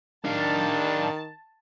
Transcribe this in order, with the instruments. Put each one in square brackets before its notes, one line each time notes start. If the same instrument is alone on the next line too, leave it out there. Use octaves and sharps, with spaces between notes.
[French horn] D#3 [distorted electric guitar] D4 F5 [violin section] A5